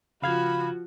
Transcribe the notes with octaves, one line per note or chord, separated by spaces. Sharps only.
C#3 F3 F#4 F5 B5 G#6